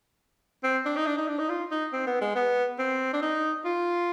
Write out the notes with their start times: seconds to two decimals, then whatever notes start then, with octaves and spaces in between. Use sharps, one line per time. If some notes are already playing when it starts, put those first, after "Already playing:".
0.63 C4
0.85 D4
0.97 D#4
1.06 D4
1.18 D#4
1.28 D4
1.39 D#4
1.49 F4
1.71 D#4
1.93 C4
2.07 B3
2.21 G#3
2.36 B3
2.78 C4
3.14 D4
3.22 D#4
3.65 F4